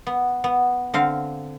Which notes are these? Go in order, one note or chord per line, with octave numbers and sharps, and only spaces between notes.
B3
B3
D3 C4 F5